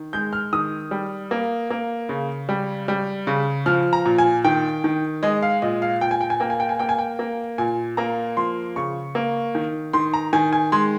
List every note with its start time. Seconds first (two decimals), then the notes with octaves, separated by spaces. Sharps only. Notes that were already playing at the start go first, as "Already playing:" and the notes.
Already playing: D#3
0.13 G#3 G6
0.33 F6
0.53 D#3 D#6
0.91 G3
1.31 A#3
1.70 A#3
2.09 C#3
2.49 G3
2.88 G3
3.27 C#3
3.66 F3 F6
3.93 A#5
4.05 A#2
4.18 G#5
4.45 D#3 G5
4.84 D#3
5.23 G#3 D#5
5.42 F5
5.62 A#2 D#5
5.82 F5
6.01 A#2 G5
6.11 G#5
6.21 G5
6.30 G#5
6.40 A#3 G5
6.50 G#5
6.60 G5
6.69 G#5
6.79 A#3 G5
6.89 G#5
6.98 G5
7.19 A#3
7.58 A#2 G#5
7.97 A#3 A#5
8.37 F3 C6
8.76 C#3 C#6
9.15 A#3
9.55 D#3
9.93 D#3 C6
10.14 A#5
10.33 D#3 G#5
10.53 G#5
10.72 G#3 C6